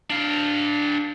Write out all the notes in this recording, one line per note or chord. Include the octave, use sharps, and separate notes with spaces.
D4 F5